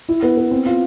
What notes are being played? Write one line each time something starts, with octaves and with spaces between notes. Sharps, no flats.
E4
B3
B3
C4
F4